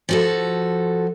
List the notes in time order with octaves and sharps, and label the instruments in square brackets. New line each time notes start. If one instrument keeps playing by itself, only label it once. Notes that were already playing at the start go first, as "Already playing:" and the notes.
[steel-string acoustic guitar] F3 F#4 A4